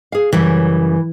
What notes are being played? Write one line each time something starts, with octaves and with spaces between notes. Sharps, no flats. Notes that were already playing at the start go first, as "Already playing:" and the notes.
G#4 F5
F#2 C#3 E3 G3